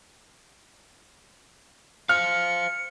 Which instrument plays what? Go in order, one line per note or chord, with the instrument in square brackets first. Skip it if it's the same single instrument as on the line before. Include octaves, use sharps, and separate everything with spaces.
[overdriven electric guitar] C5 F5 [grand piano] F6 [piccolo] C#7